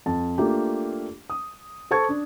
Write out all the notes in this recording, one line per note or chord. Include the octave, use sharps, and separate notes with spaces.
F2 A5
A3 A#3 D4 F4 G4
D#6
A4 C5 A5 C#6 G#6
D4